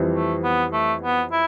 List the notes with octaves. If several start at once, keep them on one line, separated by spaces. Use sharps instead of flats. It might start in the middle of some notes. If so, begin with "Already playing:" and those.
Already playing: F2 E3 G3 C4
A3
B3
A3
B3
E4